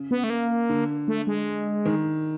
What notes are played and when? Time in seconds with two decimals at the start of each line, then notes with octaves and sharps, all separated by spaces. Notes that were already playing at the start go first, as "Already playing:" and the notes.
Already playing: C#3
0.11 B3
0.24 A3
0.30 A#3
0.69 D3
1.08 A3
1.27 G#3
1.85 D#3